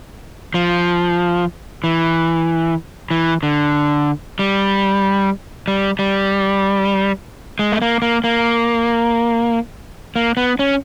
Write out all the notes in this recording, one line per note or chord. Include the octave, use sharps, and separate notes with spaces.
F3
E3
E3
D3
G3
G3
G3
G#3
A3
A#3
A#3
A#3
A#3
B3
C#4